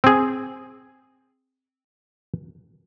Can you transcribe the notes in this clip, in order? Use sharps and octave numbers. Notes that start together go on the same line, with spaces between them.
C4 G#4